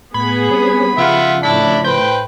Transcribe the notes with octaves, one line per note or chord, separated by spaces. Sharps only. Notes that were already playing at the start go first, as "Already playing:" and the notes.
A2 B3 G#4 B5 G#6
G3 C4 C#4
C#3 F3 F4 E5 F#5
A2 D4 E4 A5 B5
B4 C5 G5